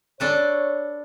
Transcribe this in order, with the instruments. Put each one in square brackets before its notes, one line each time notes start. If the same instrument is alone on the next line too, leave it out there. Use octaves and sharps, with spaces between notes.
[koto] D4 A4 B4 [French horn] C#5